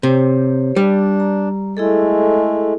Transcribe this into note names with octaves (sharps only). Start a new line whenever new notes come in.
C3 G4 C5 C#5
G3 D4
A#5
G#3 A3 E4 G#4 A4